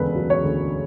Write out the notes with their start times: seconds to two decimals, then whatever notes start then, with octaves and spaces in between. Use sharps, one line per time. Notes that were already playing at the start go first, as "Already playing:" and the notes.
Already playing: E1 D2 C#3 B4
0.16 F#3
0.30 C#5
0.44 D2